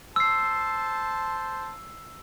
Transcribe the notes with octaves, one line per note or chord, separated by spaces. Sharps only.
C5 A5 E6 C7